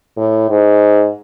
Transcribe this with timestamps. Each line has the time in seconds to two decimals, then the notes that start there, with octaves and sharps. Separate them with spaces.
0.17 A2
0.50 G#2